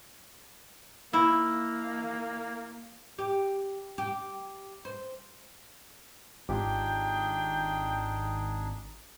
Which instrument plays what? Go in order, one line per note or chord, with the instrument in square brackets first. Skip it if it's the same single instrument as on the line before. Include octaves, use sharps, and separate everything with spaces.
[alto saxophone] A#3 [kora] E4
[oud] G4
G4
C5
[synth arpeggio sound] G#1 [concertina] D4 D#4 G#4 [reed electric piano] F4 G4 D6 [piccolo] G5